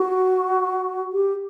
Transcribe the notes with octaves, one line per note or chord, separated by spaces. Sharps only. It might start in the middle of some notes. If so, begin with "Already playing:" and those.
Already playing: F#4
G4